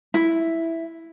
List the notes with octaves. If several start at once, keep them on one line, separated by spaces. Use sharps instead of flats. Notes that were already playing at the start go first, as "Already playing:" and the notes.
E4